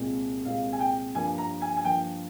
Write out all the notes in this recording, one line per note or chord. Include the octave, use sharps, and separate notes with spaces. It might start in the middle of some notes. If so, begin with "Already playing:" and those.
Already playing: C2 A#2 G#3 C4
C2 A#2 G#3 C4 F5
G#5
G5
G2 F3 A#3 G#5
A#5
G#5
G#5
G2 F3 A#3 G5